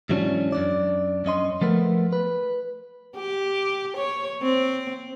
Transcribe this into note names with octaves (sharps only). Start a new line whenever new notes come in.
G#2 E3 F#3 B3 C#4 D4
F#2 D4 D5
F#2 C#4 D#5 C6
F3 A3 B3 A#4
B4
G4
C#5
C4